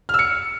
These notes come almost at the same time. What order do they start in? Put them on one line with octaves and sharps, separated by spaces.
F6 E6 C#7